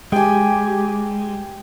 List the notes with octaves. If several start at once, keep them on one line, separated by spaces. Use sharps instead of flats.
G#3 G4 G5 G#5